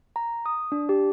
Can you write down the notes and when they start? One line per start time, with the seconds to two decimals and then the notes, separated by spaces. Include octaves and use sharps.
0.16 A#5
0.46 D#6
0.72 D4
0.89 G4